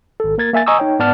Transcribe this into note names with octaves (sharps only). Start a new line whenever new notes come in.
G#1 A4
A#3 A#4 G#6 A6
A#3 E5 G#5 A6
D#5 G#5 A#5 C#6 D#6 E6
D#4 C#5 G5
G#2 B3 D5 F#5 A5 F6